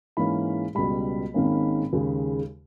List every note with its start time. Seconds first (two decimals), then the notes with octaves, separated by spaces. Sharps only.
0.17 G#2 E3 A#3 C#4 B5
0.75 C#2 B2 G3 B5
1.34 G#1 G#2 D#3 A#3 C#4
1.93 D#2 C#3 G#3